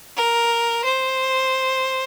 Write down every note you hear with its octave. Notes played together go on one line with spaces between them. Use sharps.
A#4
C5